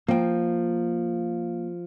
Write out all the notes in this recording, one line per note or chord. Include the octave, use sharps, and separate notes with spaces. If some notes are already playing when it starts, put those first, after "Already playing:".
F3 A#3 G5